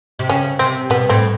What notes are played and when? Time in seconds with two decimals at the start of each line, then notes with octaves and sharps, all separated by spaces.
0.19 C3
0.29 C#3 C#4
0.59 C3 C4
0.90 B2 B3
1.10 A2 C4